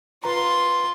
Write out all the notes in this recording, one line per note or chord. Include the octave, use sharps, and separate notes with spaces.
F4 B4 A#5 C6